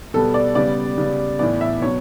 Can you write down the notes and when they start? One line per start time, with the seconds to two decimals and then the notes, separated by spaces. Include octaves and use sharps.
0.14 B2 G3 B3 A4
0.34 D5
0.55 C#3 G3 B3 D5
0.98 C#3 G3 B3
1.39 A2 E3 B3 D5
1.61 E5
1.81 B2 F#3 B3 C#5